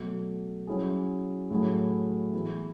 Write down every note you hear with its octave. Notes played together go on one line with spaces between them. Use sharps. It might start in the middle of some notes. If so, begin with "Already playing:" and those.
Already playing: B2 F#3 A3
F#3 C#4 E4 G#4
A2 F#3 A3 E4 G#4
E3 B3 E4 G#4